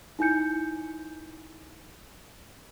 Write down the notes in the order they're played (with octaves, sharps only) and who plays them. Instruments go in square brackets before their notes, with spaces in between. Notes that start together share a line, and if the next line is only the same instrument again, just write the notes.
[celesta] D#4 E4 G#5 G6 C#7